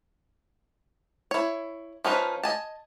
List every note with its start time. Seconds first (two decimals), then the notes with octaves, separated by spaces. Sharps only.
1.31 E4 C#5
2.05 F3 C#4 D#4 B4
2.43 D#5 G#5 A5